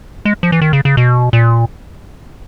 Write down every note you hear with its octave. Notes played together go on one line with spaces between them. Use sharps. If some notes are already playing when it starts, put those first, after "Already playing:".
G#3
F3
E3
D#3
C#3
C#3
B2
A#2